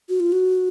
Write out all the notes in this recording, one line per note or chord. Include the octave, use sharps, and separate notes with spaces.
F#4
F4
F#4